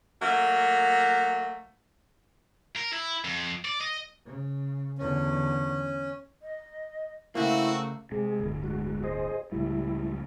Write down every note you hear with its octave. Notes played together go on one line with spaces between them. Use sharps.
F#3 A3 A#3
A#4
E4
F2
D5
D#5
C#3
E2 D3 C#4
D#5
C#3 A3 A#3 C4 E4 F#4
C3 G#3 G#4
D1 G1
G#3 F#4
G#4 C5 D#5
C#2 A2 G3 E4